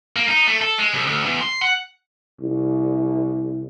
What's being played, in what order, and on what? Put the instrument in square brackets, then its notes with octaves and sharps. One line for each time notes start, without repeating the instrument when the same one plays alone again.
[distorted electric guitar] A#3
D#4
A3
A4
G#3
C2
D2
E2
C6
F#5
[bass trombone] C2